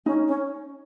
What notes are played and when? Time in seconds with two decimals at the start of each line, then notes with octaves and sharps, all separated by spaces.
0.05 C#4 D#4
0.27 C#4